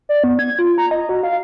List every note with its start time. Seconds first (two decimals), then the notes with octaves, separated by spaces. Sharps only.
0.09 D5
0.24 B3
0.39 G#6
0.59 F4
0.78 A#5
0.91 D#5
1.09 F#4
1.23 F5